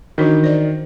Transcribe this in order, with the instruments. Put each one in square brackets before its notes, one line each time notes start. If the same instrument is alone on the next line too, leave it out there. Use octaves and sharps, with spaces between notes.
[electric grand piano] D#3 [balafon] E3 D4 F#4
[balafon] C5 D5